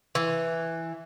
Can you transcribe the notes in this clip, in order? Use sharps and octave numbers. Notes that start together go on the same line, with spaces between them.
E3